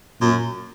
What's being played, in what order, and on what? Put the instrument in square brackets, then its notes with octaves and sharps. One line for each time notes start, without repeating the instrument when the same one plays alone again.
[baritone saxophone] F#2 [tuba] A#2